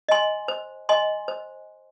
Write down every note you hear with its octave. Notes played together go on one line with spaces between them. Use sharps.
D#5 G#5 C6
C5
D#5 G#5 C6
C5